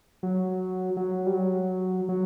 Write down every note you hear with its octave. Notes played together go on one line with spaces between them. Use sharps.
F#3
F#3
G3
F#3
F#3